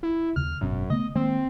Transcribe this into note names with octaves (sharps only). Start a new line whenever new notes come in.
E4
D#2 C#3 F6
G#1 F#2 B2 C#4
C#3 A3 B3 D#5
D#3 G#3 A#3 C4